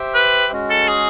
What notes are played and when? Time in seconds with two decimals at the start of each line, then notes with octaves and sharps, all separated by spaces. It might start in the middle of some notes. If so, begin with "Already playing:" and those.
Already playing: G4 C5 E5 G5
0.15 B4
0.51 G#3 C#4 F#4
0.70 A4
0.88 G#4